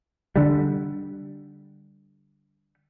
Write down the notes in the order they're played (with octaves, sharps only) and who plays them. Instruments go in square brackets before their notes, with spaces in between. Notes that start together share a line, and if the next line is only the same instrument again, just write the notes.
[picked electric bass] D3 G3